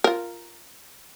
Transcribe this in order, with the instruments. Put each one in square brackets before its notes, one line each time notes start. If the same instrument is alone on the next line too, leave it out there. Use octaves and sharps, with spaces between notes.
[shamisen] F4 A#4